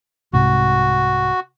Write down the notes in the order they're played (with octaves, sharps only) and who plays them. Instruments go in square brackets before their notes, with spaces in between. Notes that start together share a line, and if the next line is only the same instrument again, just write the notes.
[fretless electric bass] C2 G#2 C3 [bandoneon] F#4